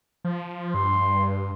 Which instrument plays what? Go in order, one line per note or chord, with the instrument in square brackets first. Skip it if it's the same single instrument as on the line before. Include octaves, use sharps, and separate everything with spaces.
[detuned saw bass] F3
[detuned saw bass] G2 [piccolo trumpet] C6